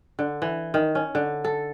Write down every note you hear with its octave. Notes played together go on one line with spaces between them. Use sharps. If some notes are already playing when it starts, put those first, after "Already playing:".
D3
E3
D#3
C#4
D3
A4